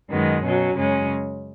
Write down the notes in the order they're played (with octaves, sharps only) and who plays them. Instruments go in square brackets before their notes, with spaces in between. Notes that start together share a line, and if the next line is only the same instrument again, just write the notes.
[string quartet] F#2 D#3 G#3 B3
B2 F#3 C#4
F#2 C#3 G#3 C#4